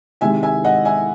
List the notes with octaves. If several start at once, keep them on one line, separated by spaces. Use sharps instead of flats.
C3 D#3 G#3 E5 G#5
E5 G#5
D#5 F#5
E5 G#5